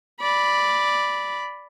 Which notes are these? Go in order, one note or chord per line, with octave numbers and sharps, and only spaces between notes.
D5 B5